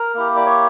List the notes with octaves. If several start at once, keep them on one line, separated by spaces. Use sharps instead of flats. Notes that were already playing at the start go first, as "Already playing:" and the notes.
Already playing: A#4
A#3 E4 G4
D5
C#5